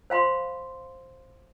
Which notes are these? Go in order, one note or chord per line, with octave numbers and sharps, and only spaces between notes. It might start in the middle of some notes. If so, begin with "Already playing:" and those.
C5 F5 B5 C6